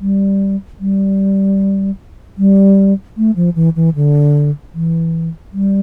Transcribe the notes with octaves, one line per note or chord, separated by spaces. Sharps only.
G3
G3
G3
A3
F3
E3
E3
D3
E3
G3